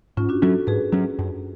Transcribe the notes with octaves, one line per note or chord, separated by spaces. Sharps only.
G#2 C#4 F4
D4 F#4
F#3 C#4 F#4 A4
G#2 G#4 B4
F#3 C#4
F#2